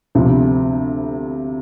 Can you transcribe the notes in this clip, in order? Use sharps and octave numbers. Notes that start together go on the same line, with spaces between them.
D2 C3 F3